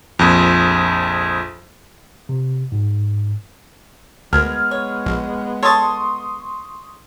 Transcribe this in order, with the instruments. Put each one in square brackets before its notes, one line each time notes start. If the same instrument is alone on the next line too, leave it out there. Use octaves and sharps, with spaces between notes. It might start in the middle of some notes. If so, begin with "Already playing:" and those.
[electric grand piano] A#1 F2
[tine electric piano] C3
G#2
[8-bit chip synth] D2 [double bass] G#3 B3 [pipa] A#4 [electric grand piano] F6 G#6
[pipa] C#5
[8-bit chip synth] A#1
[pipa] A4 A5 [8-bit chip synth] C#5 A6 [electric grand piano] C6 C#6 D#6